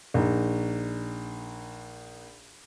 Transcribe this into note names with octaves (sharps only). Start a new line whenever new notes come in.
A#1 D#4